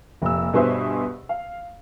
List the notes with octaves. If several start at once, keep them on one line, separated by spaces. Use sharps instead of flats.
F1 A#2 E6
G2 B2 G#4 B4 C5 E5
F5